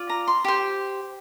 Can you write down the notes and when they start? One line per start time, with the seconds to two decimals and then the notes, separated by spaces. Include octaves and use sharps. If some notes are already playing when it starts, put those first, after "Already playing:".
Already playing: F4 D5
0.09 A#5
0.28 C6
0.45 G4 C5